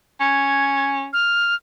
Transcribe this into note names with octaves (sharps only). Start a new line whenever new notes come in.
C#4 G#6
F6